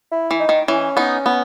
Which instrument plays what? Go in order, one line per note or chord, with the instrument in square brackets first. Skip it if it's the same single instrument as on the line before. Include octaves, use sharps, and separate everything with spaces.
[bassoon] E4
[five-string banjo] E3
[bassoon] D#4
[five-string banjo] D#3
[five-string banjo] E3 [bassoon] C#4
[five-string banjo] B3 D#4
B3